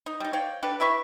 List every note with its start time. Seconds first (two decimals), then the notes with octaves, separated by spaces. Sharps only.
0.06 D#4
0.20 G3 D#4
0.33 C#5 D5 F5 G5
0.63 D4 G4 A4 B4
0.80 E4 B4 E5 C#6